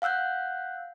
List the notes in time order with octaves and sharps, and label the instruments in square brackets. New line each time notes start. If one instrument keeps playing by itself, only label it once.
[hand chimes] F5 F#5 E6 F#6 G6